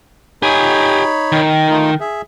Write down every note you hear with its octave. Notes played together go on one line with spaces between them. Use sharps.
D#4 G4 C#5 G#5 B5
D#3
A3 D#4 F4
G#4 E5